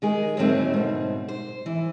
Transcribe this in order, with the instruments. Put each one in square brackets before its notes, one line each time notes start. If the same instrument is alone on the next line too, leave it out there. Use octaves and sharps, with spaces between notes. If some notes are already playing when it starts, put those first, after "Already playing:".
[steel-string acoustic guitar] D#3 G#3 G#4
D#2 G#2 D3 F#3 A3 C4
G#2 B2
C5
E3